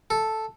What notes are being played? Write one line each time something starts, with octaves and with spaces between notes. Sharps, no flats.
A4